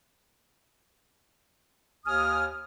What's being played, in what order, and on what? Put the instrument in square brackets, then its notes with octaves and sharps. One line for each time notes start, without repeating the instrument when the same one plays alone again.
[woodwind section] D#2 G#5 D#6 F6